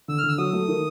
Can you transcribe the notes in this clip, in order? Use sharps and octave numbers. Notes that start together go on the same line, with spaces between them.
D3 E6
F6
D3 E6
F#3 D#6
A3
D#3